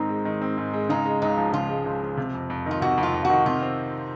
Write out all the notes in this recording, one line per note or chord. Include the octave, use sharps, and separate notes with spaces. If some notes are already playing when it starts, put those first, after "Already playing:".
Already playing: G#2 D#3 C4 D#4
G#3
D#3
C4
G#2
G#3
C#3 D#4
G#3
C#2 D#4
F3
C#3 F4
G#3
C#2
F3
C3
F2
F2
D#3 F4
C3 F#4
F2
F4
F2
F#4
D#3
C3 F4
C4